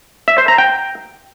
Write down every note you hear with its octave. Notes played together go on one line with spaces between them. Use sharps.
E5
C5
A#5
G5